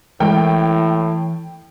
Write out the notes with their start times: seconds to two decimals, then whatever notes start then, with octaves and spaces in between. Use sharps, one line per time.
0.20 A2 E3 G#3 A#4 G5